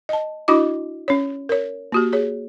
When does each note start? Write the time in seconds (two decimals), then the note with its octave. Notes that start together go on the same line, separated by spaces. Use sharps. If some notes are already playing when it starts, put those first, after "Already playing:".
0.09 D#5 A5
0.48 D4 E4 F#4 D#5 D6
1.08 C#4 C#5
1.49 A#4 C#5
1.92 A#3 F#4 G4
2.13 G#4 C#5